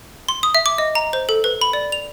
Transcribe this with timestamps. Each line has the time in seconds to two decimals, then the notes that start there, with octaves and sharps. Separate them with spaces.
0.29 C6
0.43 D#6
0.55 E5
0.66 D6
0.78 D#5
0.95 A#5
1.13 C5
1.29 A4
1.44 B4
1.61 B5
1.73 D5
1.92 F7